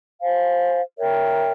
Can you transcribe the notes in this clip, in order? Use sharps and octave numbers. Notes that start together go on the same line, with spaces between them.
C5 F5 G#5
A#4 C#5 E5 G5